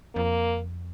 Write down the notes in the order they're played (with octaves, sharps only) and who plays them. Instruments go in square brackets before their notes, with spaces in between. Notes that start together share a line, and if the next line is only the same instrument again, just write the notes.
[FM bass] F2 [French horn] A#3